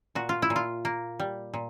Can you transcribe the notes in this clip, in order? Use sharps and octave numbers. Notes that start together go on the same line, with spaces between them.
A#2 F#4
F4
E4
A#2
F4
A#3
G3
A#2